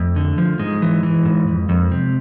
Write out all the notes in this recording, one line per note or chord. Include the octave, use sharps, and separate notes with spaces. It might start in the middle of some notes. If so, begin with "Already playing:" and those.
Already playing: F2 A3
D3
F3
G#2 G#3
E3
E3
G#2
F2
F2
C3